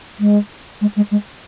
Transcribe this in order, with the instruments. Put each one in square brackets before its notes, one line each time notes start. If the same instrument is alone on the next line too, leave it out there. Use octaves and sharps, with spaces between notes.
[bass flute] G#3
G#3
G#3
G#3